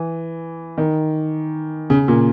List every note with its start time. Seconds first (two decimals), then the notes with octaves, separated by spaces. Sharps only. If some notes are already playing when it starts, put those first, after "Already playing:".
Already playing: E3
0.78 D#3
1.90 C#3
2.08 A#2